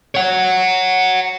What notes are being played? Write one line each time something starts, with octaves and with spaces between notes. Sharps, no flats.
C#5 F#5